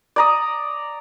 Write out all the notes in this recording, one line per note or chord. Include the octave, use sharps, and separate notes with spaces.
D5 A#5 D#6